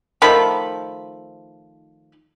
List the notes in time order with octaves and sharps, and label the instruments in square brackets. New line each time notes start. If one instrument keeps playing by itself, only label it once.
[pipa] D#3 F3 A3 B5